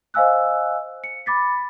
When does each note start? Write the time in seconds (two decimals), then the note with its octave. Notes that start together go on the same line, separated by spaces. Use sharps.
0.14 C5 D#5 F5 G#5 E6 F#6
1.04 C#7
1.26 B5 D6 A6 B6